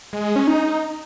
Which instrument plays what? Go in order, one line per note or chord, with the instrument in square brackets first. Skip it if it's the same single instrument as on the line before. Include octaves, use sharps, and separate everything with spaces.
[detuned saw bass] G#3
G#3
C#4
D#4